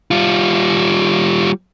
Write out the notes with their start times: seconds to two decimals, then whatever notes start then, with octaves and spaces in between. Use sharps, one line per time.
0.11 G3 F4